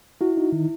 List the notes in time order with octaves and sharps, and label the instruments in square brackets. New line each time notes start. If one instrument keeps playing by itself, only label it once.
[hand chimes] E4 [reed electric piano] F#4
[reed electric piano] D#4
D#3